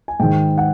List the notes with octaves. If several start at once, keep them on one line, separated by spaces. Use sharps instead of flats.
G#5
G#2 D#3 G5
F#5